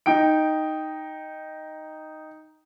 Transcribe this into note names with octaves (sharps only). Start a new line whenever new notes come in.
D#4 G5 D7